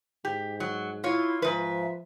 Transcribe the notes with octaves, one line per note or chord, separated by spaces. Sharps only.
G#2 G4
F#3
E4 F4 C#5
G#2 F3 B4 E5